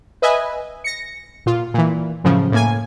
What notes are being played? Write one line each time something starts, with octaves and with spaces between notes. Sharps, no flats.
B4 D#5 E5 G#5
A#6 C#7
A#2 F4
A#2 E3
F#2 A2 C#3 F3
A2 A#3 G#5